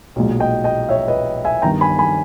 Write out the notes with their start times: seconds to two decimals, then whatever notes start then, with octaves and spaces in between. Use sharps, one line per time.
0.16 B1 A#2 G#3
0.40 D#5 G5
0.64 D#5 G5
0.89 C#5 E5
1.08 B4 D#5
1.45 E5 G#5
1.62 G2 D#3 G3 B3 G5 A#5
1.81 G#5 B5
1.99 G#5 B5